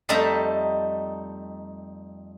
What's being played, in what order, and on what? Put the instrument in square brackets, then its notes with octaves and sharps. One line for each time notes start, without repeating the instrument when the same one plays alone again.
[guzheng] F2 G3 A3 D#4 E5 A#5